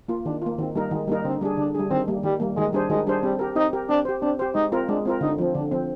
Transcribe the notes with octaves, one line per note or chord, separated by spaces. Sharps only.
A#3 F4
D#3 D4
A#3 F4
D#3 C4
G3 A#3 D#4 A#4
D#3 G#3
G3 A#3 D#4 A#4
D3 C4
G3 D4 G#4
D3 D4
G3 D4 G#4
D#3 C4
G3 A#3
D#3 G3
G3 A#3
D#3 G#3
G3 D4 G#4 C5
D#3 G#3
G3 D4 G#4 C5
G3 C4
G4 A#4
C4 D#4
G4 A#4
C4 D4
G4 C5
C4 D4
G4 C5
G#3 D#4
C4 F4 A#4
G#3 D4
C4 F4 A#4
D3 D#4
F3 C4
D3 D4
F3 C4